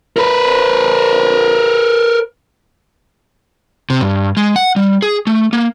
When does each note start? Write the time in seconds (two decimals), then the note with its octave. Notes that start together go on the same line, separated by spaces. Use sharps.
0.17 A#4 B4
3.90 C3
4.01 G2
4.37 G#3
4.56 F#5
4.76 G3
5.02 G#4
5.27 A3
5.53 A#3